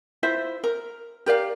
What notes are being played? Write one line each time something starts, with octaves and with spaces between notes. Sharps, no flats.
E4 F4 C5 E5
A#4
G4 A#4 D5 F5